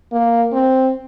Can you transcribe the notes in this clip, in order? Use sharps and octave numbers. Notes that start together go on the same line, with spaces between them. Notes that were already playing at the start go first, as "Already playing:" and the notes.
A#3
C4